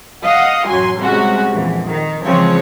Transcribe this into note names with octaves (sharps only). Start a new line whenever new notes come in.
D#5 F5 F#5 D#6
A1 F#2 F#3 G#5 C6
C3 G3 G#3 C#4 F#4
A#1 F2 E3
D#3
C#3 E3 F3 G#3 C4 C#5